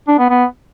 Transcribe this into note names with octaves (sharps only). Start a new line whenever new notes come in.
D4
B3
B3